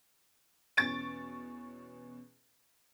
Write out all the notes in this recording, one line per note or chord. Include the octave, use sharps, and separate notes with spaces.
E2 B2 C#4 C#6 A6 D7